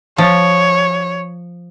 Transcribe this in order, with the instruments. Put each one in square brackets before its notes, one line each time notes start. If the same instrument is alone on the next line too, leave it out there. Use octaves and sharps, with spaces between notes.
[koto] F3 [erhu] C#5